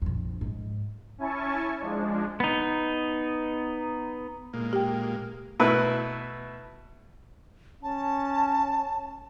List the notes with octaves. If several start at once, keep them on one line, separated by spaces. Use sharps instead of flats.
A#1 F2
G#2
C#4 E4 G#5 A5 C#6
F3 G#3 D4
B3 D#4
A#2 G#3 A#3
G4 G5
B2 A3 E4 B4
C#4 A5